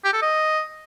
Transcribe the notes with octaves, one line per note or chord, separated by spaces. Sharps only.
G4
A4
D#5